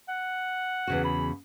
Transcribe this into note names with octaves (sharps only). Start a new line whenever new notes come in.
F#5
E2 C#3 F#4
B5